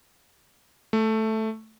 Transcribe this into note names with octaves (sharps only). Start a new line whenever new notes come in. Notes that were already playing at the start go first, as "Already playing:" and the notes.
A3